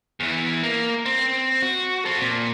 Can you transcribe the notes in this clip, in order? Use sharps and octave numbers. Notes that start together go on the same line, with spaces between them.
E2 E3
A#3
C4
F#4
C4 A4
A#2